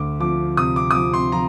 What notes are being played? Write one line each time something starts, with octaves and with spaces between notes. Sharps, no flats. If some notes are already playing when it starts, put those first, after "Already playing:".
Already playing: D2 D6
F3 D6
C3 D#6
D6
D#6
F3 D6
C6
F3 A#5